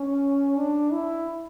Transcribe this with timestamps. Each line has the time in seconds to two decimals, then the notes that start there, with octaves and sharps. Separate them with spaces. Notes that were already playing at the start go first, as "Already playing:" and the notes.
Already playing: C#4
0.57 D4
0.92 E4